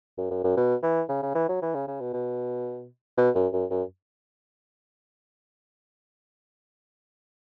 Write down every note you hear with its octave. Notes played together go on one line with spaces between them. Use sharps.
F#2
F#2
F#2
B2
E3
C#3
C#3
E3
F#3
E3
C#3
C#3
B2
B2
B2
F#2
F#2
F#2